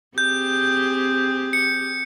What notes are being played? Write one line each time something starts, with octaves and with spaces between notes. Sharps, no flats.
C4 G4 G#4 G6
C#7